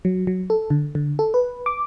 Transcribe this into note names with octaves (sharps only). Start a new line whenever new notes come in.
F#3
F#3
A4
D3
D3
A4
B4
D6